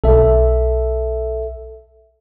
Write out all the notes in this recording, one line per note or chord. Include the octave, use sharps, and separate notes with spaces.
B1 A4 E5